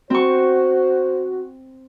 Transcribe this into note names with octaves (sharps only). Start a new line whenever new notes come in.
C4 F#4 C5 C#6